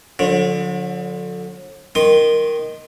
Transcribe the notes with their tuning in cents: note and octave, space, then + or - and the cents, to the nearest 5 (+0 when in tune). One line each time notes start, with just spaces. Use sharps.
D3 +0 F#3 -45
D#3 +0 C6 +5 D#6 -25